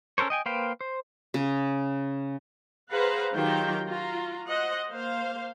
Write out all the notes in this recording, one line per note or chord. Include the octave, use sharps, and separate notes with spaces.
C#4 A4 A#4 C5 C#5
D#5 G5 G#5
A#3 B4 C5 F5 G5
C5
C#3
G#4 B4 C5 F5 F#5 A#5
D#3 F#3 F4 G4 A#4 G5
F4 F#4 A#5
C5 D#5 F#5
A#3 C5 F5